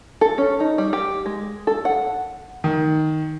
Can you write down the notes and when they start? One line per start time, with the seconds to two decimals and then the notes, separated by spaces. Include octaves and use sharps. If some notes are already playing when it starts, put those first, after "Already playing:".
0.21 A4
0.38 C#4
0.60 D#4
0.78 G3
0.93 G4
1.26 G#3
1.67 A4
1.85 F#5
2.64 D#3